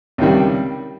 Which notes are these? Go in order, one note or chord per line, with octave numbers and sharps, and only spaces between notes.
C#2 C3 D#3 G3